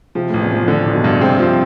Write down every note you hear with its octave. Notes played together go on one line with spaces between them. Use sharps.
C3 F3
A2
A1
E2
F3
F2
A2 D3
A1
B2
G2
C3 C4
F3